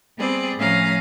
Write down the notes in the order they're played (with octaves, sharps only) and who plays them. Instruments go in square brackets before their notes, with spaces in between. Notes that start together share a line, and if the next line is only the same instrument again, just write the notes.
[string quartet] G3 B3 C4 G#4 D5
A2 F3 C#4 F5 A#5 D#6